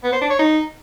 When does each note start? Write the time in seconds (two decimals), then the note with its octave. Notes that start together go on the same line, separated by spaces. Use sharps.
0.04 B3
0.13 C5
0.21 D4
0.30 C#5
0.39 D#4